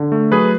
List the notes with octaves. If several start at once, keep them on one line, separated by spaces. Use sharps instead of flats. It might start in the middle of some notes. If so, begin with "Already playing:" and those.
Already playing: D3
A3
F#3 G#4 B4